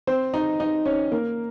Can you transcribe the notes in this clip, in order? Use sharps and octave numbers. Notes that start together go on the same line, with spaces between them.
C4 C5
D#4 D#5
D#4 D#5
C#4 C#5
A#3 A#4